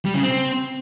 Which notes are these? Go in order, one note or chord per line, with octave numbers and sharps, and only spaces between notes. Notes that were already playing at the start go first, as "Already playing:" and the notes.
G3
C#3
C4